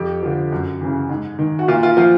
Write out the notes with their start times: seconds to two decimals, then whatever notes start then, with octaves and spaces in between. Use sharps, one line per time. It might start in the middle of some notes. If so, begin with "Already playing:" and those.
Already playing: F2 G4
0.23 D3 F3
0.52 F#2
0.81 C#3 E3
1.09 G#2
1.39 D#3
1.59 F#4
1.68 A#2 F4
1.83 F4
1.97 F3 F4